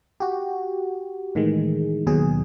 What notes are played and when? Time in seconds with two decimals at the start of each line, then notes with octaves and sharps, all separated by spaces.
0.20 F#4 G4
1.35 A2 D#3 E3 G#3
2.07 D#2 B2 F#3 G#4